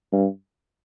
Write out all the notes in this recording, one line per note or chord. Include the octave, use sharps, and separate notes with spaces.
G2